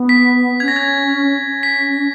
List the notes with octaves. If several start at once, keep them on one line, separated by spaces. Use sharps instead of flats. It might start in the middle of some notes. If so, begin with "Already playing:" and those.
Already playing: B3
B6
C#4 G#6
A#6
G#6
C#4
B6